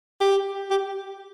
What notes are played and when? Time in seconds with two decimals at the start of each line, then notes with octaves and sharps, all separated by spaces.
0.20 G4
0.70 G4